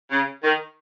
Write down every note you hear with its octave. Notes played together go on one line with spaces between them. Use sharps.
C#3
D#3